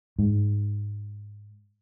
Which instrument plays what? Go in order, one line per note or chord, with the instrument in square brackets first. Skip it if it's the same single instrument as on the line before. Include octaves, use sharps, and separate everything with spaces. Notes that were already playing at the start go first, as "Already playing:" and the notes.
[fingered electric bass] G#2